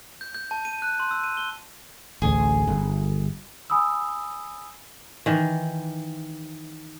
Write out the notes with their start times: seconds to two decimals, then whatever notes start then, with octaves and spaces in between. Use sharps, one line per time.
0.21 G6
0.35 G6
0.51 A5
0.65 D#7
0.82 F#6
1.00 C6
1.11 E6
1.24 D#7
1.37 G7
2.22 A1 D2 G#4
2.67 G1
3.70 G#5 B5 D#6 E6
5.26 D#3 E3